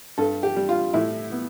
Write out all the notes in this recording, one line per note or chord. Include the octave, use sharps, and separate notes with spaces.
G2 A4
G4
G3
F4
A2 E4
B3